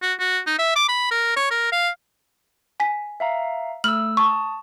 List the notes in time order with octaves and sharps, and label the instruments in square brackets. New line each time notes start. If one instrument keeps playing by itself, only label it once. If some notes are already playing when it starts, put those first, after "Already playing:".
[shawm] F#4
F#4
D#4
E5
D6
B5
A#4
C#5
A#4
F5
[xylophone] G#5 B6
[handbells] E5 F5 A#5
[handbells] A3 E6 [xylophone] F6 F#7
[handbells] A5 D#6 [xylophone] C#6